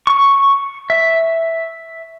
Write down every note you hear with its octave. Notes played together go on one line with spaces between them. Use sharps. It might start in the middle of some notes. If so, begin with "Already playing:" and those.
C#6
E5